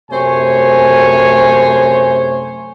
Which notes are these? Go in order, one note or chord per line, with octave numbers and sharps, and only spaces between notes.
F#2 C3 A3 C5 C#5 G#5